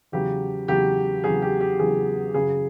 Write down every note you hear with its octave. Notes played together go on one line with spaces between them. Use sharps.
E2 C#3 F#3 G4
E2 C#3 F#3 G4
E2 C#3 F#3 G#4
G4
G4
E2 C#3 F#3 G#4
F#2 C#3 F#3 G#4